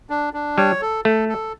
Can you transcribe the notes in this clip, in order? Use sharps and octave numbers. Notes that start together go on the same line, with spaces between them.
D4
D4
G3 C#5
A4
A3 A4
A4